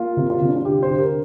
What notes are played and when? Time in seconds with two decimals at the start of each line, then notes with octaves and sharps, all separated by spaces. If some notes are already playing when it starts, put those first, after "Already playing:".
Already playing: A#3 F4
0.17 C3
0.30 F4
0.41 C3
0.48 D4
0.56 F4
0.65 D3 G4
0.83 C5
0.89 D3 G4
1.00 A#4